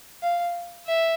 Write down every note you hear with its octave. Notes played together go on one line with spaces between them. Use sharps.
F5
E5